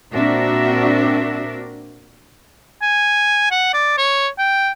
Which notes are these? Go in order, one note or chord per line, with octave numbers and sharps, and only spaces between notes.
A#2 C4 D4 F#4 A#4 E5
G#5
F#5
D5
C#5
G5